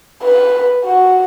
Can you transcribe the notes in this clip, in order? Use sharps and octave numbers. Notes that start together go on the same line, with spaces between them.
B4
F#4